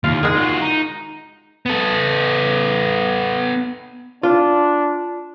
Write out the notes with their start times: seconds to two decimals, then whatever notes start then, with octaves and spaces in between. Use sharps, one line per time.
0.04 D#2 F4
0.23 D#3 G#3 G#4
0.36 F4 F#4
0.61 D#4
1.66 B3 A4
4.23 D4 F4